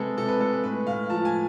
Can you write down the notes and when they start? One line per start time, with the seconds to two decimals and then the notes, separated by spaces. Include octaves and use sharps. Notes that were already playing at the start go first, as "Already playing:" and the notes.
Already playing: C3 G#3 A4 B4
0.17 C3 A4
0.28 B4
0.40 G#3 A4
0.53 B4
0.64 A2 B4
0.87 A2 F5
1.10 F3 A5
1.25 G#5